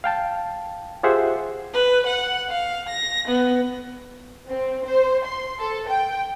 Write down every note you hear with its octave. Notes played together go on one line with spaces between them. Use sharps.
F5 G5 A5
F4 G4 G#4 C5 E5 F#5
B4
F#5
F5
A#6
B3
C4
C5
C6
A4
G5